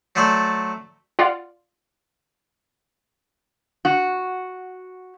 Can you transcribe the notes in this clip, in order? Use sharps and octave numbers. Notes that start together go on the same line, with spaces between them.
F#3 A3 C5 D5 D6
F4 D5 F5 F#5
F#4